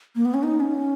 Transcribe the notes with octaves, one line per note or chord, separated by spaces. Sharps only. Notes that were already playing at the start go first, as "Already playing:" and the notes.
A#3
B3
C#4
D#4
C#4